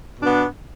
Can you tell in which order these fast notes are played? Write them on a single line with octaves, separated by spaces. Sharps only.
B2 D4 B3